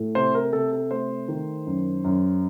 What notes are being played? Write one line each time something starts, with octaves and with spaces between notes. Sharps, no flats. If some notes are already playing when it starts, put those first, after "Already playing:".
Already playing: A2 A3
C3 C5
A#4
C3 A4
A4
A3 C5
D#3
F#2
F#2